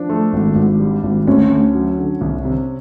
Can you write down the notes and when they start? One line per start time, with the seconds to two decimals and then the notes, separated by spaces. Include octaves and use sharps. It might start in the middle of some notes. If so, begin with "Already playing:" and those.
Already playing: F3 D4
0.09 A3
0.33 G#1
0.56 G#1
0.80 G3
1.03 G#1
1.27 D2 C#4
1.50 D2
1.75 F#3
1.98 D3
2.21 C2
2.45 C3